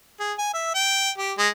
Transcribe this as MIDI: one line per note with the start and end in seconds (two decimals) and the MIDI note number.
0.20 0.33 68
0.38 0.50 80
0.54 0.70 76
0.75 1.10 79
1.18 1.33 67
1.38 1.48 56